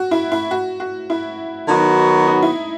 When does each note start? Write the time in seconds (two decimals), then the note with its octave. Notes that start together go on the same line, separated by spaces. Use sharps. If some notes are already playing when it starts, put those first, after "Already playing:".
Already playing: F#4
0.11 E4
0.32 E4
0.51 F#4
0.80 F#4
1.10 E4
1.69 D#3 F#3 B3 D#4 F#4
2.27 D#4
2.42 E4